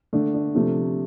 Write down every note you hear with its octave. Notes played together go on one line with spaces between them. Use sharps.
D3 A3 D4
D4
C3 F3 A3